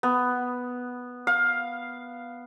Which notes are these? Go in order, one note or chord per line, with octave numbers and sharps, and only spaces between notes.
B3
F5